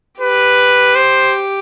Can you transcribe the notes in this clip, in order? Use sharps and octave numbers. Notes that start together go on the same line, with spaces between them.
G4 B4
C5